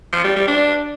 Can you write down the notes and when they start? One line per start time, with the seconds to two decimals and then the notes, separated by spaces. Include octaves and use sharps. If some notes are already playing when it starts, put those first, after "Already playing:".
0.13 F3
0.24 G3
0.36 G3
0.48 D4